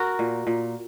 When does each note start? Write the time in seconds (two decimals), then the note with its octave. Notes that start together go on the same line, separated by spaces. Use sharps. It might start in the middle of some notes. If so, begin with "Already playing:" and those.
Already playing: F#4 A#4
0.19 A#2
0.47 A#2